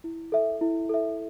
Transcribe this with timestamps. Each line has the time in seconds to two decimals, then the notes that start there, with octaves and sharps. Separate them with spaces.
0.04 E4
0.32 A4 E5
0.61 E4
0.89 A4 E5